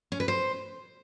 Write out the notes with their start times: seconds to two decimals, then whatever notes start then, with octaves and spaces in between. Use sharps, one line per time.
0.12 C#4
0.20 B4
0.28 C5